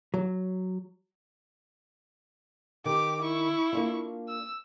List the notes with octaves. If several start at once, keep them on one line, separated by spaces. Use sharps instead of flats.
F#3
D#3 G4 D6
E4 C#6
A#3 D4 F4
E6